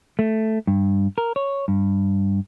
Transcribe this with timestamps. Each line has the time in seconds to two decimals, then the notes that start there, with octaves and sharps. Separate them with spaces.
0.19 A3
0.67 G2
1.18 A#4
1.36 C#5
1.68 G2